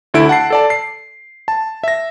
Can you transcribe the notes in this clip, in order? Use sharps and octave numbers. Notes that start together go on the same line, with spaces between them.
D2 D3 E4 A4 D7
F#5 A5 C7
A4 D5 A5
C7
A5
E5 A#6